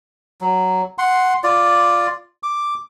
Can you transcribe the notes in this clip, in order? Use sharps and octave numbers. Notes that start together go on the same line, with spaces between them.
F#3
F#5 C6
F4 D5
D6